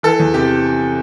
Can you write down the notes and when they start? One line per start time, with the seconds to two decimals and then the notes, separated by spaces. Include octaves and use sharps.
0.03 E3 A4
0.20 E2
0.34 C3 G4